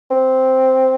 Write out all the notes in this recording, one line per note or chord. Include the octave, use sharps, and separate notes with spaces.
C4